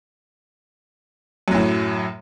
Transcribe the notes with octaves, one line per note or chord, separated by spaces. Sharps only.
F#2 A2 F#3